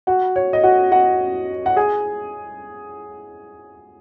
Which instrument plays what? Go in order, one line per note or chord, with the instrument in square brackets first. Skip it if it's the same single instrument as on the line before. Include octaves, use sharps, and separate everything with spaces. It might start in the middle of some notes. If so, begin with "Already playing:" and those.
[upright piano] F#4 F#5
C#5
D#5
F#4 F#5
F#4 F#5
F#5
G#4 G#5